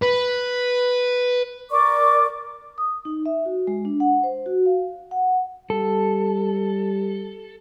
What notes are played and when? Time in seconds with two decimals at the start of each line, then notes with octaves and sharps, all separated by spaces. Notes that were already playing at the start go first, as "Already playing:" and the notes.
0.02 B4
1.71 A#4 D5 C#6 D6
2.78 D#6
3.05 D#4
3.26 E5
3.45 F#4
3.67 G#3
3.85 D4
4.00 F#5
4.24 C5
4.46 F#4
4.66 F5
5.11 F#5
5.70 G3 A4